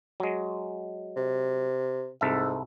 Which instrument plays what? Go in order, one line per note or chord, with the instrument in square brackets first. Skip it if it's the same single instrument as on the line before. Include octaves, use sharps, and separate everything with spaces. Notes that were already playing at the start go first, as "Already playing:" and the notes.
[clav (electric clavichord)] F#3 G#3
[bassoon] C3
[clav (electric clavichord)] C2 A4 E5 [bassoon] G#2